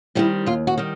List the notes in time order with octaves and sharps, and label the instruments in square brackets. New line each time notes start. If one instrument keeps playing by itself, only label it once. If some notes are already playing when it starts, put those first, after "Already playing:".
[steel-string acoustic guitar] D#3 G3 C4 E4
D#2 F4
F#4
D#3 G3